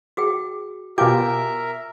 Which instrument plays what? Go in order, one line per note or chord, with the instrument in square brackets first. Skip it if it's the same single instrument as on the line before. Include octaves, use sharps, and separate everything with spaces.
[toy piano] F#4 G#4 G5
[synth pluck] B2 G5 [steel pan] F4 G4 [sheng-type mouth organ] A#4 E5 [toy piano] G#5 D6